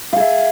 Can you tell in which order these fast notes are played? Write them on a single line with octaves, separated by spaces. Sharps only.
F5 G#4 E5